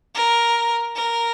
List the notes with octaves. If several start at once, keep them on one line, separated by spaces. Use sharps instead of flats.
A#4
A#4